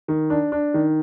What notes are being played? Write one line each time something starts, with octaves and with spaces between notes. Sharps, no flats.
D#3
D4
D4
D#3